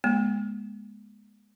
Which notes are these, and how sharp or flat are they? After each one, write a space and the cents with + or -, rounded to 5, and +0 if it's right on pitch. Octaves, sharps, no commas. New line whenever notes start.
G#3 +0 B3 -45